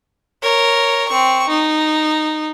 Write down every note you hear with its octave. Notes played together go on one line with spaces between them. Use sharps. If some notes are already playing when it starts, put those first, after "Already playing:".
A#4 C#5
C4 C#6
D#4